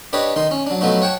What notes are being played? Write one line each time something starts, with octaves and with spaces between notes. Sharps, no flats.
D4 G4 B4 C#5 D#5
D#3 D#4 C6
C#4
F#3 D4
F3 F#3 A3 B3 D#4 F#4
C#5 F#5 G5 A5